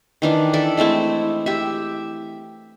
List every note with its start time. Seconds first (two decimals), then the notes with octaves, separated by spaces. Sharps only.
0.22 D#3 E3 D4
0.53 A4 D5 E5
0.77 G#3 A3 C4 E4
1.46 G4 E5